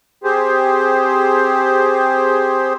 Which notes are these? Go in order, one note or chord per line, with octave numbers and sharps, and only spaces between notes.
C4 G4 G#4 C5